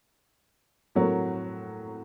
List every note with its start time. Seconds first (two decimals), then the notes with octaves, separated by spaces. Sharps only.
0.95 A2 F#3 C4 F#4 A#4